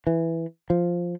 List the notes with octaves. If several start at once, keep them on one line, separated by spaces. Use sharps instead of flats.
E3
F3